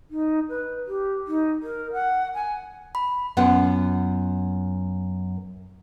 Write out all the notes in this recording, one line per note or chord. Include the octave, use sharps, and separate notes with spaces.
D#4
B4
G4
D#4
A#4
F#5
G#5
B5
F#2 B3 F4 F#5